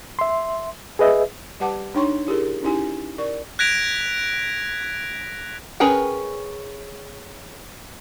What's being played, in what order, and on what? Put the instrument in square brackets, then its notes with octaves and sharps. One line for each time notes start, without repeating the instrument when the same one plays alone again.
[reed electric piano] E5 C6
G#4 B4 D#5 E5
[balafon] G3 G4 B4 F#5 A5 D6
D4 D#4 C#5 G5 C6 C#6
E4 G4 G#4 A#4
C#4 D#4 E4 G4 G#5
A#4 D5 C#6
[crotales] F#6 G#6 A#6 B6 D7 F7
[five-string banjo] C#4 G#4 A#4 B4 G5